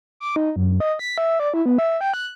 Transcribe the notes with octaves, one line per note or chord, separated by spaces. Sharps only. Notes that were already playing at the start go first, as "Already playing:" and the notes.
D6
D#4
F#2
D#5
B6
E5
D5
E4
B3
E5
G5
F#6